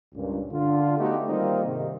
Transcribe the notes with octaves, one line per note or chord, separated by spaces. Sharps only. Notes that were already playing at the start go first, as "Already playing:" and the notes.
C#2 G2 A#2
D3 F4
A3 B3 D#4 F#4 G4
D#3 G3 A#3 C4 D#4 F4
G#2 C3 D#3